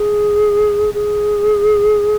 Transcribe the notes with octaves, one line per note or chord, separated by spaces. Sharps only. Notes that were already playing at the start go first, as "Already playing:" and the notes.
Already playing: G#4
G#4